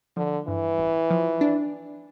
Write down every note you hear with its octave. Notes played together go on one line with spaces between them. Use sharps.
D3 F3
G2 E3
A1
F3
D4